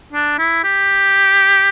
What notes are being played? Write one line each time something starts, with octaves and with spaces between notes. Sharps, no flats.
D4
E4
G4